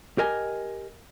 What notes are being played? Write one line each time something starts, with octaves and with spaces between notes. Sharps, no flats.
G4 A#4 D#5 G#5